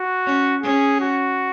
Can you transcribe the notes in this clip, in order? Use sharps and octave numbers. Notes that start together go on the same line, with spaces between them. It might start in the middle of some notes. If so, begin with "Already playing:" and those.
Already playing: F#4
C#4
C#4 G#4
F#4